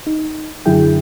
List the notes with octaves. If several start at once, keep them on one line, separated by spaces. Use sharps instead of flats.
D#4
F#2 D3 F#3 E4 G#4 G5